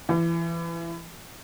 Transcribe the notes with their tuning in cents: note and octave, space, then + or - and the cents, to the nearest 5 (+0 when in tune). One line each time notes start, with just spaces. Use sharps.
E3 +25